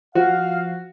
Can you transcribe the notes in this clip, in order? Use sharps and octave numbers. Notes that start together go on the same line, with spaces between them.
F3 F#4 F5